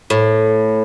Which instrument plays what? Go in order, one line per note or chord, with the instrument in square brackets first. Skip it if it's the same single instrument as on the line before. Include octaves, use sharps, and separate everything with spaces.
[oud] A2